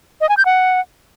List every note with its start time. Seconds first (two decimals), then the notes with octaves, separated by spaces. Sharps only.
0.21 D#5
0.29 G#5
0.37 G6
0.46 F#5